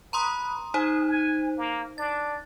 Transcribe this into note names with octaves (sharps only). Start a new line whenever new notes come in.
B4 A#5 C6 D#6
D#4 G#4 C5
G#5
A#3
D4 A6